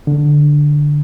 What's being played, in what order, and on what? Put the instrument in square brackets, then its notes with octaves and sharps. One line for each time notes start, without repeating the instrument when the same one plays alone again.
[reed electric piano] D3